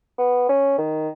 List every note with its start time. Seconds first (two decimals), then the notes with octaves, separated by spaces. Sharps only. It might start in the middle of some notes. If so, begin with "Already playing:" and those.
0.18 B3
0.49 C#4
0.78 D#3